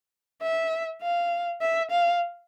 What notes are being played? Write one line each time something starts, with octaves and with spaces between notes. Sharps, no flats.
E5
F5
E5
F5